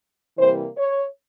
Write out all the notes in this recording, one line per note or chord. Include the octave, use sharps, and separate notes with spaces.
C3 E3 G3 A#3 C5
C#5